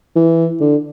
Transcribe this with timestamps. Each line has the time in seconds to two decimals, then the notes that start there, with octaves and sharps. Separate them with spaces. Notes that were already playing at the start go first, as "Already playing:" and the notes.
0.16 E3
0.61 D3